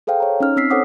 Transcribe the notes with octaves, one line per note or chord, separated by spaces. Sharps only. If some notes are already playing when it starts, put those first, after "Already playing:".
G#4 A4 C5 F5 G5
C#5 A#5
C#4 D#4 F6
C4 E6 B6 C7
A4 C5 C#5 F#5 D6 D#6